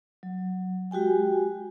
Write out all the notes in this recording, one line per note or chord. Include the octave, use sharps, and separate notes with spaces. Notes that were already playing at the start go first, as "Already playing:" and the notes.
F#3
G#3 F#4 G4 G5 G#5